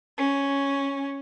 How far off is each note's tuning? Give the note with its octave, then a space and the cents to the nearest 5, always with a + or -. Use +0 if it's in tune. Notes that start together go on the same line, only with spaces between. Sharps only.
C#4 +0